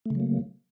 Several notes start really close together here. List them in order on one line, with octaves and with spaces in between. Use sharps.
A3 C#3 F#3 A#3